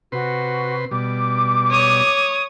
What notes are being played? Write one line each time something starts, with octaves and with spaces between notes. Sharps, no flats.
C3 F#4 B4 C6
B2 G3 D6
C#5 D#6